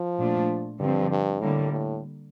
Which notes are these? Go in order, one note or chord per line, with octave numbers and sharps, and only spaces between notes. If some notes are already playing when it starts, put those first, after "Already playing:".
Already playing: F3
A#2 A3 D4 F4
G2 D3 F3 C4
G2
A2 D3 G3 A#3
A2